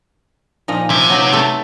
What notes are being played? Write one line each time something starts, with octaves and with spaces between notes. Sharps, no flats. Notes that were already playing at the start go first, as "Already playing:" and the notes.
A#2 F3 D#4
C3 F3 E4
F#3 D#4 B4
A3 A4